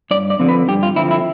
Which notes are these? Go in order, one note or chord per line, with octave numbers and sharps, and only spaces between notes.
G2 D5
D5
D3 F3 C4
B4
G2 G4
F4
D3 F3 C4 E4
E4